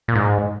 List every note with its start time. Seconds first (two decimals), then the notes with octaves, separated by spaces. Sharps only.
0.08 A#2
0.15 G#2